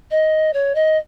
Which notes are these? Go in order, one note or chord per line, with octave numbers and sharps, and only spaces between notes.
D#5
C#5
D#5